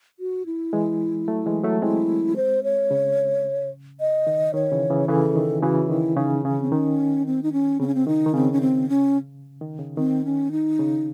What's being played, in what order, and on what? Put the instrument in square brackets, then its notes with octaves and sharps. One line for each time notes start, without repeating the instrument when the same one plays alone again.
[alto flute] F#4
E4
[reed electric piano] E3 G#3
F#3 A3
E3 G#3
F#3 A3
[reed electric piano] G#3 C4 [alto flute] E4
[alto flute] C5
C#5
[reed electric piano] C#3
[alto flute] D#5
[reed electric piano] D#3
[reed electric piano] D#3 [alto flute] C#5
[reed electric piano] C#3 E3
C#3 E3
[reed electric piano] C#3 E3 [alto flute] A4
[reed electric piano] D#3
[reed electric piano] C#3 E3 [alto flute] F#4
[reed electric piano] D#3 [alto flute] E4
[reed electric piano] C#3 [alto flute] D#4
[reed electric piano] C#3 [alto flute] C#4
[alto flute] C4
[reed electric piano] D#3 [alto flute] C#4
[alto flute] C4
D#4
C#4
[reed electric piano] C#3 [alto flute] C4
[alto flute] C#4
C4
[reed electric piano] D#3 [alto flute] D#4
[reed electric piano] D#3
[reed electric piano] C#3 [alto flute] C4
[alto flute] C#4
C4
C#4
[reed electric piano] D#3
C#3
[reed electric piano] D#3 [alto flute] C4
[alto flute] C#4
D#4
[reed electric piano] C#3